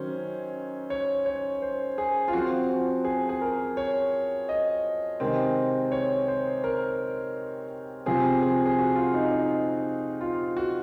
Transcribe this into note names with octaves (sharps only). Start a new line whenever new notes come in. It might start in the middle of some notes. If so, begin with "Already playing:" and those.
Already playing: D#3 F#3 C#4 C5
C#5
C#5
C5
G#4
F4
F3 C4 F#4
F#4
G#4
G#4
A#4
C#5
D#5
C3 D#3 G#3 C4
C#5
C5
A#4
C3 F3 C4 G#4
G#4
G#4
F#4
F4
D#4
D#4
F4
F#4